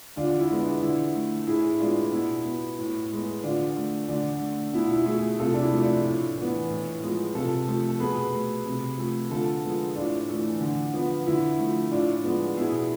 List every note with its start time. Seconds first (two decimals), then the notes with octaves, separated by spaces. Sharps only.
0.16 D3 D4 F4
0.39 E4
0.50 G#3 B3
0.60 D4
0.82 D3 E4
1.15 A3
1.47 A2 E4 G#4
1.80 G#3 B3 D4 F4
2.13 B2 E4
2.45 B3
2.79 A2
3.11 G#3 B3
3.43 D3 D4 F4
3.77 A3
4.09 D3 D4
4.41 A3
4.73 B2 E4
4.83 F4
4.93 E4
5.06 A3 E4 G#4
5.39 C3 F4 A4
5.54 D4
5.61 E4
5.72 F3 A3
5.82 D4 F4
6.04 A2
6.37 E3 B3
6.70 A2
7.02 F3 G#3 B3
7.35 C3 F4 A4
7.68 F3 A3
7.89 A4
8.00 B2 G#4 B4
8.33 A3
8.66 C3
8.98 F3 A3
9.30 D3 F4 A4
9.64 F3 G#3 B3
9.96 A2 D4 F4
10.29 E3 A3
10.61 D3
10.94 F3 B3
11.26 D3 E4
11.59 F3 A3
11.92 A2 D4 F4
12.24 F3 G#3 B3
12.57 B2 E4 G#4